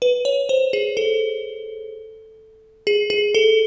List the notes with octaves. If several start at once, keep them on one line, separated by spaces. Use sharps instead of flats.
B4
C#5
C5
G#4
A4
G#4
G#4
A4